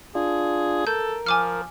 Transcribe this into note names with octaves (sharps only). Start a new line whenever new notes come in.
D4 F4 G#4
A4 A#4 G6
F3 G#5 D6 F6